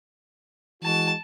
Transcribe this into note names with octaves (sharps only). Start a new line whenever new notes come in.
E3 G#3 F#4 A5